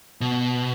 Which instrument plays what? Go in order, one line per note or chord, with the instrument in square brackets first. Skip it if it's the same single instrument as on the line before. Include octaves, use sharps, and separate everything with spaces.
[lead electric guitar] B2